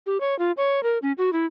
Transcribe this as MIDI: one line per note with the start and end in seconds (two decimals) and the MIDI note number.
0.06 0.20 67
0.21 0.37 73
0.39 0.52 65
0.57 0.83 73
0.83 0.98 70
1.02 1.12 61
1.18 1.33 66
1.33 1.46 64